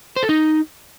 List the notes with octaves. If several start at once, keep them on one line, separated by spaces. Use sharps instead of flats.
C5
A4
D#4